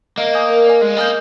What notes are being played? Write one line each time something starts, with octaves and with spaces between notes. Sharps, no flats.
A#3 D#5
G#5 D#6 G6
A#4
D5 G#5
G#3 D#5
A#3 G#5 D#6 G6